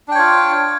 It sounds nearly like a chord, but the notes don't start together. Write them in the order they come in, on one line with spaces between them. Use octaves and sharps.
D4 G5 C#5 F4